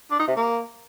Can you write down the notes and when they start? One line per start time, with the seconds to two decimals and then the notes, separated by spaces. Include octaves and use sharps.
0.11 D4
0.19 D#4
0.28 C3
0.36 A#3